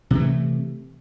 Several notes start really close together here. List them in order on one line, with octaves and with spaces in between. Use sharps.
C3 E3 A3